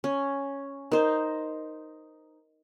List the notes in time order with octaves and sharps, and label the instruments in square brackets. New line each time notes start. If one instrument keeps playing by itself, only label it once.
[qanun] C#4
[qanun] D#4 C5 [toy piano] A#4 D#5